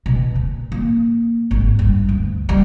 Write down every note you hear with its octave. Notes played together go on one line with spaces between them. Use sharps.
B2
A#2
A#3
G#1
G2
D2
G3